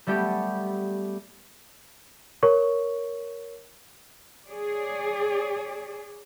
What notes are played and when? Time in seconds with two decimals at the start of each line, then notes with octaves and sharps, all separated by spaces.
0.07 G3 A3 B3 G4
2.43 A#4 C#5 C#6
4.46 G#4 C#5 D5